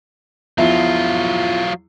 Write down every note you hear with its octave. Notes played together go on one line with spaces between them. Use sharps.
E2 F3 F#3 E4 F4